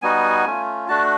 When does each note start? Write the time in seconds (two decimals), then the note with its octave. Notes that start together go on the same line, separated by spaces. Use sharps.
0.02 G3 B3 D#4 F#4 G#5
0.46 A3 C#4 F4
0.88 A3 D4 F#4 A5